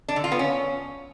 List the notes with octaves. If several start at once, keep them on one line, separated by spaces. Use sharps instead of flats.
D4
D3
F4
B3
C#4